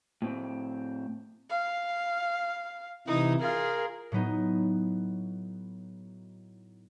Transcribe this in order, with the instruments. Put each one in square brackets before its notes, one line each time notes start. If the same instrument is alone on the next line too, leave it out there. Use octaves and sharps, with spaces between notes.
[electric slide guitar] A2 C4
[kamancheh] F5
[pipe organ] C3 E3 E4 [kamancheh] D#4 D#6
[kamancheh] F4 G#4 [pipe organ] A#4
[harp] A2 F#3 B3 D#4